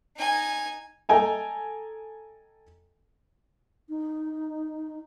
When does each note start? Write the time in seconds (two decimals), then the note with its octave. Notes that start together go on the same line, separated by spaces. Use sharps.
0.17 D#4 G#5
1.09 A4 D#5 G5 G#5 A#5
3.89 D#4